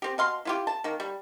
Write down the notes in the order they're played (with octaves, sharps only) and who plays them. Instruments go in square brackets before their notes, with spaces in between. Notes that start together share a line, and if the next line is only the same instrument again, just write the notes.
[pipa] C4 G4
B2 F5 C6
E4 F4 G4
A5
D#3 A#3
G3